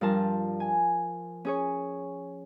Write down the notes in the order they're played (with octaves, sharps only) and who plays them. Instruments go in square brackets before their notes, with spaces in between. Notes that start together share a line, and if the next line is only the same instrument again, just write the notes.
[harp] G2 F3 G3 A#4 A5
G#5
C#4 G#4 C#5